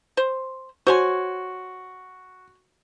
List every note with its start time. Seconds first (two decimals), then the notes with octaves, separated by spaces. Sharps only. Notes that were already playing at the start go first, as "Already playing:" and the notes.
0.17 C5
0.87 F#4 C5 C#5 G#5